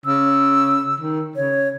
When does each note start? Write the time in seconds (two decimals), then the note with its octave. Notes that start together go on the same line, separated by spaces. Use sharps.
0.06 C#3 E6
1.00 D#3
1.36 C#3 C#5